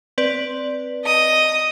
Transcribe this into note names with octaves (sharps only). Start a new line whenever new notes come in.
C4 B4 D5
D#5 D#6